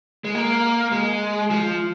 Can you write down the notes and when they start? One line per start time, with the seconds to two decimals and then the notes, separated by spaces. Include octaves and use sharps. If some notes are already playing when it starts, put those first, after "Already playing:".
0.25 G#3
0.35 A#3
0.92 G#3
1.50 F3